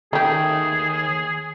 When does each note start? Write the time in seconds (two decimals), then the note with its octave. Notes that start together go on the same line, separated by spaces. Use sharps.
0.13 D#2 D#3 A3 G4 G#4